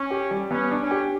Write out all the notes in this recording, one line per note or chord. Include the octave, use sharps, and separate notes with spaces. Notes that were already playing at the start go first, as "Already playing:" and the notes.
Already playing: C#4
G4
G3
B3 C#4
D4
C#4
G4